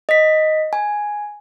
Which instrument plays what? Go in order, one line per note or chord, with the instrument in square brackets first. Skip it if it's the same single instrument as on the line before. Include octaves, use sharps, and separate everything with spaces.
[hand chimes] D#5 B6
G#5